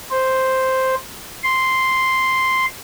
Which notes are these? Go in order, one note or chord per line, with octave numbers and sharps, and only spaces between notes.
C5
C6